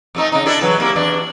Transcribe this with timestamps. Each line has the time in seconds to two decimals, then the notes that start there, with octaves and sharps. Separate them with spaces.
0.15 F2 A3 D#4
0.32 C#3 D#4
0.46 D4 E4 A4
0.61 C#3 E3 F#3
0.78 C3 A#3 E4
0.96 E2 D4